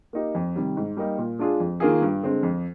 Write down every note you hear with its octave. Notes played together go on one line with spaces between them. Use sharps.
A#3 D#4 G4
F2
C3 D#3 G3
G#2
G3 A#3 D#4
A#2
G#3 D4 F4 G#4
F2
D#3 A#3 F4 G#4
G2
D3 G#3 C4
F2